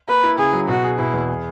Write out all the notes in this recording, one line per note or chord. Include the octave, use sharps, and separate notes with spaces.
A#3 B4
E4
C#3 G#4
F#3
B2 F#4
G#4
B2 E4
E2
G#4